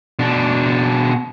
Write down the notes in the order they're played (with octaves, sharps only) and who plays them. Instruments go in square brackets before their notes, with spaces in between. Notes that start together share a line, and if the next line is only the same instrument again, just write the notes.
[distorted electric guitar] B2 D4